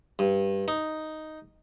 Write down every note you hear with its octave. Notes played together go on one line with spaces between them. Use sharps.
G2
D#4